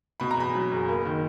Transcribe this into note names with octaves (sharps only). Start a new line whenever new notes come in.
B2 B5
A#5
E2 B5
F#3
F#1
A#3
D#3